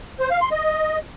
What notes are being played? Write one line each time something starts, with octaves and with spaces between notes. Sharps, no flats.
C5
F5
C6
D#5